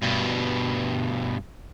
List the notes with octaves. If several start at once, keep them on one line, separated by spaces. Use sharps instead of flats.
G2 B2